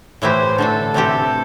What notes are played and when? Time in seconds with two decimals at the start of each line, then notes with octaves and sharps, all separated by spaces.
0.22 A2 E3 A3 E4 G4 C5
0.58 D3 A3 D4 A4
0.94 C3 E3 A3 C4 G4 A4